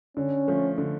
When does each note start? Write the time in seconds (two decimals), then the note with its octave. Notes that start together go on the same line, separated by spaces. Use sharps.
0.17 D3 C#4
0.48 F3 A3
0.78 D3